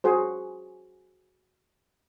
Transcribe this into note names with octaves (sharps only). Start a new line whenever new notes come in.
F#4 G#4 C5